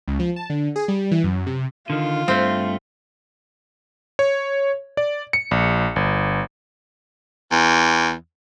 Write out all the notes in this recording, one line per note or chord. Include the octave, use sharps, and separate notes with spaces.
C#2
F3
A5
D3
G#4
G3
E3
F#2
C3
D3 D#3 F4
G2 A3 C4
C#5
D5
C#7
A#1
G1
E2